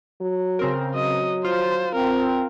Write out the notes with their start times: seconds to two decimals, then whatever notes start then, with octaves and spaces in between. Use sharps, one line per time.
0.21 F#3
0.59 C#3 C4 A#4
0.95 F#3 D#5
1.45 F4 C5
1.95 C4 A#4